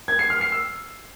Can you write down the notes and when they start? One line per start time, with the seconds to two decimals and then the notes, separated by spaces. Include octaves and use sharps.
0.08 G#6
0.19 C7
0.30 F6
0.41 C7
0.52 E6